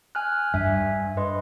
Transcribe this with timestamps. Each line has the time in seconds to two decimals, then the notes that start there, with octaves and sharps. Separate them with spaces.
0.15 G#5 F6 F#6
0.54 G2 E5 G#5
1.17 B4 D#5 C6